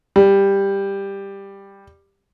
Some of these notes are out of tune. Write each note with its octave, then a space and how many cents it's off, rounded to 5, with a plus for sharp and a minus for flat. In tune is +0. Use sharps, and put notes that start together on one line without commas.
G3 +10